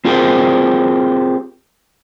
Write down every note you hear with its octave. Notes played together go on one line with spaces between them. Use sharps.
C4 F4 G4 G#4 A#4 C5